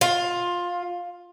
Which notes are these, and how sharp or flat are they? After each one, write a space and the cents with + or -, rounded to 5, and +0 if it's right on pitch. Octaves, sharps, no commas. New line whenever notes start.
F4 +15